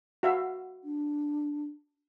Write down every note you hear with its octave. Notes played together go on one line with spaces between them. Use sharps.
F#4 E5 F5
D4